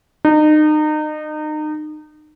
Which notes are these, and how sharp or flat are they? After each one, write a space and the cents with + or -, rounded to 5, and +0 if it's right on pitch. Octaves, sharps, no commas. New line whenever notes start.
D#4 -30